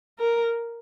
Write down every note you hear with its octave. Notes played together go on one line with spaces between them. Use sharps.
A#4